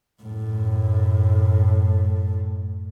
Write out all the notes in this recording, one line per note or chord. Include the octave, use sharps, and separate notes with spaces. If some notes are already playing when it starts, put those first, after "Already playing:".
F#2 A2